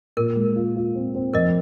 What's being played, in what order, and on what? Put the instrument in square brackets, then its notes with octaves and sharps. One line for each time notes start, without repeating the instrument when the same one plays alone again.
[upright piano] A#2 [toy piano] A#4
[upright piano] G#3
F4
F4
C4
C4
[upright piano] F1 [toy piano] A#4 D#5